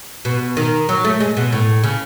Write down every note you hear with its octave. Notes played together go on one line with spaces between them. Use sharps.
B2
D#3
F#3
A3
G#3
B2
A2
C#3